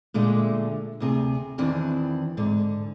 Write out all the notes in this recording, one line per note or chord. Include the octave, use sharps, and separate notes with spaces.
A#2 D3 G#3 A3
D2 C3 G#4
E2 D#3 E3 C4 D4
G#2 D3